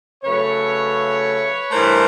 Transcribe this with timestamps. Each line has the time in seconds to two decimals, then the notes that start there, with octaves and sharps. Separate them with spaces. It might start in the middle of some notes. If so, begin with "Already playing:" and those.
0.24 C#3 F#3 A3 B4 C#5
1.71 G2 E3 A3 A#4 C5